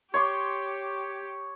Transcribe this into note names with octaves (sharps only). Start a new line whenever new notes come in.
G4 C#5 C6 D6